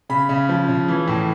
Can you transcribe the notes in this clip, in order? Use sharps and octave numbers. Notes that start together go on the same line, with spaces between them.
C#3 B5
C#3
F3
C#3
E3
A2